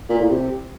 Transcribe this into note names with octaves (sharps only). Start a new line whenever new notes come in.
A#2
A2
C3